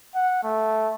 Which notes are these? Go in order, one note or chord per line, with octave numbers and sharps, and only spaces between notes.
F#5
A3